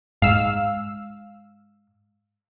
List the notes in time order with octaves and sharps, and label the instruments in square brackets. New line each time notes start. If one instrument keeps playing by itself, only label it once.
[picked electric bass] G#2 [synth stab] F5 E6